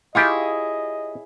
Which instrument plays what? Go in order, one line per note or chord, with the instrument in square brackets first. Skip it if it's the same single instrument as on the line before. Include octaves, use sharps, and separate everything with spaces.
[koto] E4 G#4 C#5 [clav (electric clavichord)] F4 G4 G5 [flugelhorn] D#5